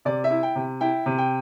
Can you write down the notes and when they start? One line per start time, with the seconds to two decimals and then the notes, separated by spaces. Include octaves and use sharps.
0.05 C3 D5
0.24 E5
0.31 E4
0.43 G5
0.55 C3
0.81 E4 G5
1.06 C3
1.18 G5